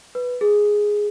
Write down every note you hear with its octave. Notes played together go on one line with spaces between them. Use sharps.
B4
G#4